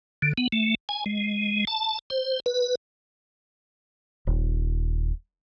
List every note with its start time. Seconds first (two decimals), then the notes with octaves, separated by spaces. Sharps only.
0.22 D3
0.38 B3
0.52 A3
0.89 G#5
1.06 G#3
1.67 A5
2.10 C5
2.46 B4
4.27 D#1